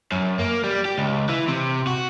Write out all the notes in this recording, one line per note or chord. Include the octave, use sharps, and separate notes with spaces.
F#2
A#3
G3
G4
C#2
E3
C3
F#4